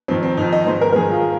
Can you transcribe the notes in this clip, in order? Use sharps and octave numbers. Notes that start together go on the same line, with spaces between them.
F2 D#3 C4
C4
F2 D#3 D#4
D#5
G#2 D#3 C5
A#4
A#4
G#2 D#3 G#4
F4